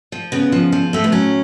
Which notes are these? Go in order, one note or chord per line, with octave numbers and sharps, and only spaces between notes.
F3
C#3 B3
F3
F3
A2 A3
B3
F#3 C#4